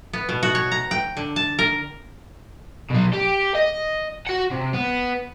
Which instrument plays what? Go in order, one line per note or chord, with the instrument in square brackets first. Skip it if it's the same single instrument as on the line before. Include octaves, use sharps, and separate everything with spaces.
[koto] B3
B2
F#4
C#5
A#5
G5
D3
A5
A#4
[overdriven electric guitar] B2 F#3
G4
D#5
F#4 F#5
C3
B3